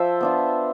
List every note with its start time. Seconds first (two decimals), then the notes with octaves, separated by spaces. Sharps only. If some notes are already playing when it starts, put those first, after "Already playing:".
Already playing: F3 C5 E5 A5
0.21 B3 D4 F4